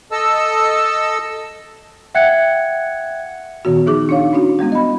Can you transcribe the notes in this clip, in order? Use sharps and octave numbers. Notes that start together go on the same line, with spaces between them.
A4 D#5 A5 E6
E5 F#5 G5 F#6 G#6 C#7
A#2 D#3 B3 F#4
F3 D#4 G#4 D6
D4 D#4 C#5 F5
C#4 D4 E4 F#4
G3 G#3 B3 E4
D#5 B5